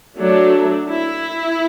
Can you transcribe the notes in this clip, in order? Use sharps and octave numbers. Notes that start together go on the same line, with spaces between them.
F#3 A3 D4
E4